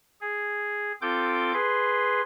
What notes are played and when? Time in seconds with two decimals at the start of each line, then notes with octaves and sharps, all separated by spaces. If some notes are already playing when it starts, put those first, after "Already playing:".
0.21 G#4
1.02 C4 F4 A4 G5 D6 G6
1.53 G#4 B4 C6